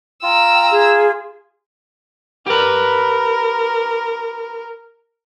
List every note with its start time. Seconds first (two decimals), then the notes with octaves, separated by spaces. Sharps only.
0.23 F4 G5 A#5 E6
0.71 G#4
2.47 G4 A#4 B4